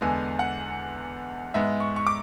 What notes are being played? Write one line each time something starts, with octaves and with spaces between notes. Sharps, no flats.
E2 D3 G#3 B3 G#5
F#5
G#2 G#3 B3 E5
C#6
C#6
D6